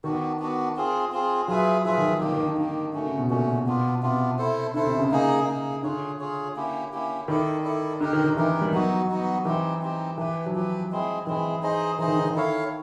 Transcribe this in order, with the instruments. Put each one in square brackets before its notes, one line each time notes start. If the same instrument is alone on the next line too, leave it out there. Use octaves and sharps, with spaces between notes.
[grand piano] D#3 [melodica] B3 D4 F#4
[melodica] B3 D4 F#4
C4 F4 G#4
C4 F4 G#4
[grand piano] F#3 [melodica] F4 G#4 B4 E5
[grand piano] F3 [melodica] F4 G#4 B4 E5
[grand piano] D#3
[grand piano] D#3 [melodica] A#3 D4 G4
[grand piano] D#3
D3
[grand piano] D3 [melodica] A#3 D4 G4
[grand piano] D3 [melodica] A3 C#4 F#4
[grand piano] C#3
B2
[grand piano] A#2 [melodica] A3 C#4 F#4
[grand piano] B2 [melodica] B3 D4 F4
[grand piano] C3 [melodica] B3 D4 F4
[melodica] E4 A4 C5
[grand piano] D3 [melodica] E4 A4 C5
[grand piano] C3
C#3
[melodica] A#3 D#4 G#4
A#3 D#4 G#4
[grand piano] D3 [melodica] F4 G#4 C#5
[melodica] F4 G#4 C#5
A#3 C#4 E4 G4
A#3 C#4 E4 G4
[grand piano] D#3 [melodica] E4 A4 D5
[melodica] E4 A4 D5
[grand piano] D3 [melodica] D#4 G4 A#4
[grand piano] D#3
D#3
[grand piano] E3 [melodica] D#4 G4 A#4
[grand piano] G3
[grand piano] F#3 [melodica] B3 D#4 F#4
[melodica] B3 D#4 F#4
[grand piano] E3 [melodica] C4 D#4 G4
[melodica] C4 D#4 G4
[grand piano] E3 [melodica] D4 G4 B4
[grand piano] F#3
[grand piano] F3 [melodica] D4 G4 B4
[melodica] G#3 C4 E4 G#4
[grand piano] E3 [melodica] G#3 C4 E4 G#4
[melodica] D#4 G#4 C5 D#5
[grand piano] E3 [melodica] D#4 G#4 C5 D#5
[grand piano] D#3
D3
D#3
[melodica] E4 A4 C#5 F5